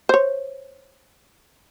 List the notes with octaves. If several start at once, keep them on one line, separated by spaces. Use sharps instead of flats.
C5 C#5